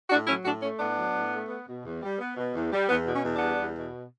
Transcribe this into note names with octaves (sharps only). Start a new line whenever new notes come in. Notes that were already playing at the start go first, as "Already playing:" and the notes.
A2 D4 F#4
F#3 C#4 E4
A2 D4 F#4
A3 C#4
A2 B3 D4
F#3
A2
A3
B3
B2
E2
G3
B3
B2
E2
G3
E2 B3
B2
C#4
E2
B3 D4
G3
E2
B2